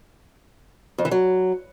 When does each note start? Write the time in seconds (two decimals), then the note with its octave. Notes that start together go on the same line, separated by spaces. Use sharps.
0.98 F2
1.05 E3
1.11 F#3